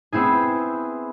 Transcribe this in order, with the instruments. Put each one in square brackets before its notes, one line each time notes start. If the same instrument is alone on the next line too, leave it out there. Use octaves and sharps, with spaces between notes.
[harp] B3 C4 E4 G#4